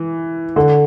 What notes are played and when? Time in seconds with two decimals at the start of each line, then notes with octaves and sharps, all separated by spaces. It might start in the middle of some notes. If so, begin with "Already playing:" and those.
Already playing: E3
0.56 D3